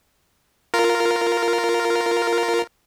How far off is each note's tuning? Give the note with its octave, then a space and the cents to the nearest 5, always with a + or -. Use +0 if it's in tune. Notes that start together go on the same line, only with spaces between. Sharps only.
F4 +0 A#4 -5